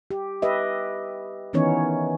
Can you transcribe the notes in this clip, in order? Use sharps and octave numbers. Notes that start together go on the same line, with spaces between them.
G4
G4 B4 D#5 E5
D#3 E3 B3 C#4 D#4 C#5